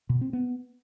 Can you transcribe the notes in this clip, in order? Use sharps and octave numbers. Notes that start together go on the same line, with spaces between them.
B2
C4
B3